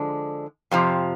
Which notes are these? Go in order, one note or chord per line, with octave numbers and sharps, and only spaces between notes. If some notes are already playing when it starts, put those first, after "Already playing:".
Already playing: D3 F3 G#3 D4
F2 C3 F3